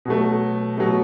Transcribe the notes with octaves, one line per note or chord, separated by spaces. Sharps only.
B2 F#3 A3
B2 F#3 A3